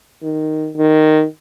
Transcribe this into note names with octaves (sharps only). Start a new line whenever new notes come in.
D#3
D#3